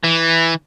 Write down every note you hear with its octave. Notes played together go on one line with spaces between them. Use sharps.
E3